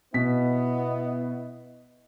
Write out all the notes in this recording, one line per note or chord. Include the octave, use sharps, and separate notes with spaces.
B2 B3 E4 D#5 B6